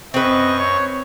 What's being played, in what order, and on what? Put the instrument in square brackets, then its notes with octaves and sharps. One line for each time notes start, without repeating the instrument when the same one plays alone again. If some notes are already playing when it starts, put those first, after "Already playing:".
[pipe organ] F#2 C#6 [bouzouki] C4 B4 [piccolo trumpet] D#5
[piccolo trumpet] C#5